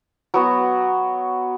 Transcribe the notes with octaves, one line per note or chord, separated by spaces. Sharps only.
F#3 B3 F#4